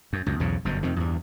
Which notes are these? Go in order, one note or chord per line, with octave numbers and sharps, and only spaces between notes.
F#2
C#2 F#2
B1 E2 G#2 C#3
G1 F#2 B2
F2 C3 D#3
E2 G2